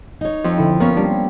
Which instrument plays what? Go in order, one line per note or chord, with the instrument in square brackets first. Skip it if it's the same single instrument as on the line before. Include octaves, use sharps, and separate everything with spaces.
[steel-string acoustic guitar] D#4 C#5
[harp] F2 [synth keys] F3
[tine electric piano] D3 E4
[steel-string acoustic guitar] A#3 C#5 [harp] B3 C#4 [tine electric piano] A#4
[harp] G3 [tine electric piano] D4